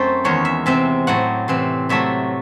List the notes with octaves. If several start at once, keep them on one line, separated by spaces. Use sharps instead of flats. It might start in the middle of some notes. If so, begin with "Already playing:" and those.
Already playing: F#2 A3 C4 C5
E2 D#3 G#3 C#5
E5
C3 E3 C4 E5
A2 F#3 C4 F#5
C3 E3 C4
C3 F#3 A3 E5